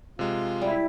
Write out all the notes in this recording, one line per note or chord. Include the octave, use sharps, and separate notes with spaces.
C3 G#3 F4
G3 E4